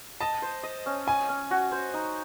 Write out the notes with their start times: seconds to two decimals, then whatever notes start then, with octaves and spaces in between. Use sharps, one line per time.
0.20 D#5 A5
0.42 C5
0.63 D#5
0.86 C#4
1.07 D#5 G#5
1.29 C#4
1.51 F#4
1.72 C5
1.94 D#4